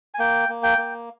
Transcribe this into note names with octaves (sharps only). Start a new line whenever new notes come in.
G#5
A#3 G5
A#3
G5
A#3